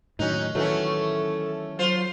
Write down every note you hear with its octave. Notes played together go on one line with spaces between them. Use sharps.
A2 D#3 F#3 C#4 D#4 F#6
D#3 E3 F#3 A3 C#4 A4
F#3 F4 C5